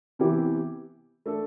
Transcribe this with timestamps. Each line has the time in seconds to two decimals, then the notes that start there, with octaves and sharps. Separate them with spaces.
0.19 C3 E3 B3 E4 G4
1.26 A3 D4 A4